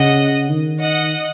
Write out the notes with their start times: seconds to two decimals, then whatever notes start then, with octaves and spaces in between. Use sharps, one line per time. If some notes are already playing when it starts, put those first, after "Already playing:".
Already playing: C#3 D#5 F#5
0.50 D#3
0.80 D#5 F#5